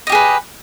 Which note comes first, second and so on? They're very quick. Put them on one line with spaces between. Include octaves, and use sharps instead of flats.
D#5 G4 G#4 B4